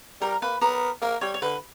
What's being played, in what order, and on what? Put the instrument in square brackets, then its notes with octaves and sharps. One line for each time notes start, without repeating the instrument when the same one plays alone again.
[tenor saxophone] G3 [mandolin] A#4
[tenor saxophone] A#3 [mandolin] B4
[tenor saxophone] B3 [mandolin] A#4
[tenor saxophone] A#3 [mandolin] A#4
[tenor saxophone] G3 [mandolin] C#5
[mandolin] C#5
[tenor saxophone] D3 [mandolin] B4